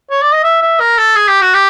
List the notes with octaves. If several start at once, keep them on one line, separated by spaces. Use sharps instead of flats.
C#5
D5
D#5
E5
E5
A#4
A4
G#4
G4
F#4
G4